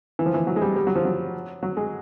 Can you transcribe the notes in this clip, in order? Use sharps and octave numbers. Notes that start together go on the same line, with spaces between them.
E3
F3
E3
F#3
G#3
G3
G3
F#3
F3
F#3
F#3
G#3